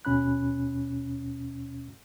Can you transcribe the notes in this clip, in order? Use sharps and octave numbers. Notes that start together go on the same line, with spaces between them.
D#2 B2 C#4 B5 F#6